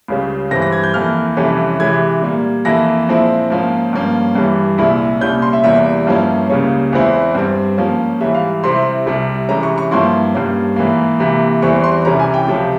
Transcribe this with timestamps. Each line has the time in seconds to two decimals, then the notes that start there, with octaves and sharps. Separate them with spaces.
0.08 C#2 C#3 G3 C#4
0.51 G2 E3 G3 C4 A#6
0.62 A#6
0.72 G#6
0.83 G6
0.94 F2 E3 A#3 F6
1.37 F2 C3 E3 G3 C#4
1.80 C3 E3 G#3 G#6
2.22 A#2 G3 A#3
2.65 F2 E3 A#3 E4 A#6
3.08 A#2 F3 G#3 C4 E4
3.50 G#2 F3 A#3 C#4
3.93 G2 F3 A#3 C#4
4.35 G2 E3 G3
4.78 C2 A#2 G#3 E4
5.21 C2 A#2 G3 C#4 G6
5.42 C6
5.53 E5
5.64 E2 C3 G3 A#3 E4 E5
6.07 G2 F3 A#3 C#4 E4
6.50 C#2 C#3 G3 A#3 C#4 C#5
6.92 E2 E3 G#3 C4 E4
7.35 G2 G3 C4
7.78 G#2 F3 A#3 C#4
8.21 G#2 E3 G3 E5
8.34 F5
8.63 C3 G3 C4 E4 C6
9.06 C2 C3 G3
9.49 C3 E3 G#3 C#4 A#5
9.63 C#6
9.78 C#6
9.91 G2 F3 A#3 E4 C6
10.35 G2 G3 A#3 C#4
10.76 G#2 E3 A#3
11.20 C3 E3 A#3
11.62 E2 E3 G3 C4 C#6
11.84 C6
12.05 C2 C3 E3 G3 C#4 A#5
12.19 G#5
12.34 G5
12.47 C#2 C3 F3